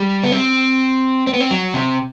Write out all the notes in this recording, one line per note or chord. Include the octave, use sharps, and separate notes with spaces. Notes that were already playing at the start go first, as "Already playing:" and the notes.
Already playing: G3
B3
C4
C4
B3
C4
F#3
C3